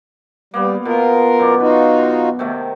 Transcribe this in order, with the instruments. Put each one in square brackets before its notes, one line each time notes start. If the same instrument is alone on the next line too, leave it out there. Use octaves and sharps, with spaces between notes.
[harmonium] G3 [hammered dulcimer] A#3 B3
[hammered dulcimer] B2 [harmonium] F4 A#4
[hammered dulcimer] F#2 B2 D5
[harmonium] D#4 F4 F#4 [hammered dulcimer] B4
[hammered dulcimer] C3 D#3 A3